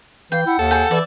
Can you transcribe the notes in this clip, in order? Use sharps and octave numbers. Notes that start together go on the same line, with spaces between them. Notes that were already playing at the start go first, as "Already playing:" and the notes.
E3 F5 G5
E4 F#5
D#2 A4
G#4 G5
E3 D5 E5